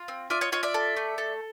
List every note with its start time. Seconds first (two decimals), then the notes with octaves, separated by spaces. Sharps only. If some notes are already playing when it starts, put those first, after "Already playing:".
Already playing: F4
0.08 C4
0.30 F4 D5 E5
0.41 C#5 D#5
0.52 F4 C#5 D#5
0.63 D5 E5
0.74 A4
0.96 A3
1.18 A4